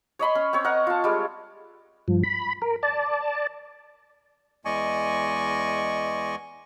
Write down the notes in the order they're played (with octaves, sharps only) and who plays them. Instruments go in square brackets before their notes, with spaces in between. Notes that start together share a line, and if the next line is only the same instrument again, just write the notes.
[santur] C#5 D#5 B5 C6
C#4
C4 C#5
A#4 D#5 F#5
F4 A5
G3 G#3
[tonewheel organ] G2 F3
B5
A#4
D5 A5
[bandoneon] E2 G#3 D5 D#5 G#5 C#6